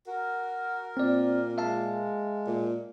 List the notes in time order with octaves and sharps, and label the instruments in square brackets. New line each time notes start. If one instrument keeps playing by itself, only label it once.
[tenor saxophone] F#4 [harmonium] A#4
[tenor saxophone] A#2 [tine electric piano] C4 D5
[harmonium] G#3 [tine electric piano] E5 F5 A5
[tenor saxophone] A#2